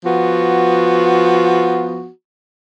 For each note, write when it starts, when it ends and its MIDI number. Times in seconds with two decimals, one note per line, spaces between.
0.05 2.09 53
0.05 2.09 59
0.05 2.09 66